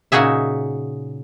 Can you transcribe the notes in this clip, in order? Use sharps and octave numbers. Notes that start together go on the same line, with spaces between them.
A#2 C#3 D#4 F#4 G#4 E5